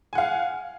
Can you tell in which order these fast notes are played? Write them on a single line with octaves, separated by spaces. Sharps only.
G#5 F#5 F5